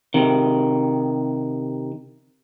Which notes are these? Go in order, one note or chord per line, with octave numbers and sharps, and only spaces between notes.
C3 D#3